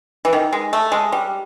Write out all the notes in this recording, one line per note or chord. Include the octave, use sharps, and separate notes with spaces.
E3
D#3
G#3
A3
G#3
G3